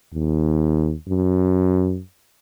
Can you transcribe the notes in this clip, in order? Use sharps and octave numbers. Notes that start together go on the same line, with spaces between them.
D#2
F#2